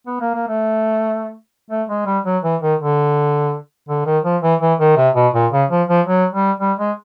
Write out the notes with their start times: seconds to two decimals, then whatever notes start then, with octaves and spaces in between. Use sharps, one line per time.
0.07 B3
0.21 A#3
0.35 A#3
0.48 A3
1.71 A3
1.89 G#3
2.06 G3
2.25 F#3
2.44 E3
2.62 D#3
2.80 D3
3.89 D3
4.06 D#3
4.24 F3
4.42 E3
4.61 E3
4.79 D#3
4.97 C3
5.15 B2
5.34 A#2
5.52 C#3
5.70 F3
5.89 F3
6.06 F#3
6.33 G3
6.60 G3
6.79 G#3